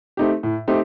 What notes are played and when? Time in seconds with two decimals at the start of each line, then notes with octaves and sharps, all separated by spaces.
0.17 A3 C4 D#4 G4
0.43 A2
0.68 A3 C4 D#4 G4